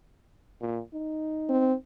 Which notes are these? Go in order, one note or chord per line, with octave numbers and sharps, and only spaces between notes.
A#2
D#4
C4